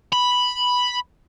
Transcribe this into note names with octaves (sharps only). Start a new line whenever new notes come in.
B5